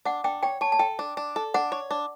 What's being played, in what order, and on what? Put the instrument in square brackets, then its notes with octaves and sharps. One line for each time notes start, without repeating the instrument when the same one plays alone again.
[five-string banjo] D4 [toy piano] F#5
[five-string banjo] D4 [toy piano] G5
[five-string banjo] C#5 [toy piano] G5
[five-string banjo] C#5 [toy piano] A5
[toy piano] A5
[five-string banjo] A4 [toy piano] G5
[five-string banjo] D4
D4
A4
[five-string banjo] D4 [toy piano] F#5
[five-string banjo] C#5
D4